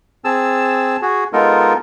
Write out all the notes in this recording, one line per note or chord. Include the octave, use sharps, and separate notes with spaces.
C4 G#4 A5 E6
F#4 G#4
G#3 B3 D#4 F4 A4 A#4